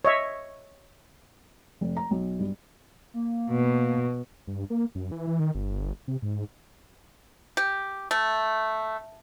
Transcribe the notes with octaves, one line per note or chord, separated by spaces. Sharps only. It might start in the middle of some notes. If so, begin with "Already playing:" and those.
C#5 D#5 E5
F1
A#5
B1
G2
A#3
B2
G2
A#3
F#2
E3
E3
D#3
G1
C3
G#2
G4
A3